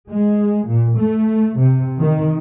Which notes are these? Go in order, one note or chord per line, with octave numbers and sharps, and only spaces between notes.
G#3
A#2
A3
C3
D#3